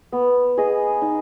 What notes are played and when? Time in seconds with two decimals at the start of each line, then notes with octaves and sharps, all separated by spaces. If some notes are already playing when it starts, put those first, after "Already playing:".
0.12 B3
0.57 G#4 D#5
1.02 D#4